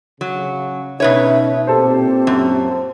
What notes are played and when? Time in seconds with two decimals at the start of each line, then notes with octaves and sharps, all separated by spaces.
0.21 C#3 F#3
1.00 B2 C#4 D#4 B4 C#5 E5
1.67 A#2 C4 G4 A4 C5
2.27 F#2